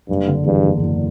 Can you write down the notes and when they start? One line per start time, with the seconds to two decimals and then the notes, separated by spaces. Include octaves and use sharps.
0.09 F#1 G2
0.28 D3
0.46 E2 G2
0.64 F#1
0.82 F#1